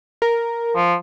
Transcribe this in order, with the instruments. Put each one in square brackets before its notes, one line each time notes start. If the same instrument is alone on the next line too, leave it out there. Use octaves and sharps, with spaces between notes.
[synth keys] A#4
[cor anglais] F3